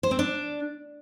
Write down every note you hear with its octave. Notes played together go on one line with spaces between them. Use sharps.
C5
C4
D4